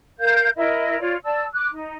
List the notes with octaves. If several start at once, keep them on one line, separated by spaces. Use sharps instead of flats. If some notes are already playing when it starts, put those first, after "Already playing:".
A#4 F5 G6
E4 A#4 D#5
F4 C#5 D5
D5 A5 E6
D6 F#6
D#4